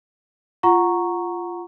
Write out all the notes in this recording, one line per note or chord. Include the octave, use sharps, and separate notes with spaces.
F4 F#5 A#5 C#6